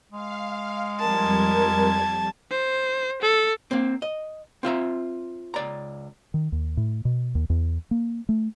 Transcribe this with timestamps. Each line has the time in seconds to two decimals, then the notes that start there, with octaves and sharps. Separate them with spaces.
0.12 G#3 F5
1.00 F2 G3 A#4 A5 G#6
2.51 C5
3.22 A4
3.71 A#3 C4
4.02 D#5
4.63 C4 F4 E5 A#5
5.54 C#2 D5 A#5
6.34 D#3
6.52 D#2
6.77 A2
7.05 B2
7.35 D#2
7.50 E2
7.91 A#3
8.29 A3